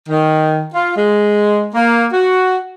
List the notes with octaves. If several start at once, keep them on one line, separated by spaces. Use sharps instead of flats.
D#3
F4
G#3
A#3
F#4